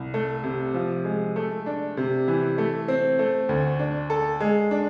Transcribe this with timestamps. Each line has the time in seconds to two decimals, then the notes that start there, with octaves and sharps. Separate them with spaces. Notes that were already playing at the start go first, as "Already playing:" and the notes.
Already playing: C2
0.14 A3
0.44 C3
0.74 F3
1.05 G#3
1.36 A3
1.66 D4
1.97 C3
2.28 E3
2.58 A3
2.88 C4
3.19 A3
3.49 D2
3.79 D4
4.10 A4
4.40 G#3
4.71 D4